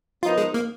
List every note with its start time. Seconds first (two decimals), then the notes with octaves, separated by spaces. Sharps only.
0.22 F3 B3 D#4 F4 A#4
0.38 G#3
0.54 A#3